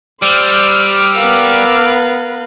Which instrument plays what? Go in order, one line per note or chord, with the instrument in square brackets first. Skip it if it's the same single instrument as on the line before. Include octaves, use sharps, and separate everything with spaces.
[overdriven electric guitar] G3 [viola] C5 [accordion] D6 E6 F6
[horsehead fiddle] B3 A#4 [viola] B4 F5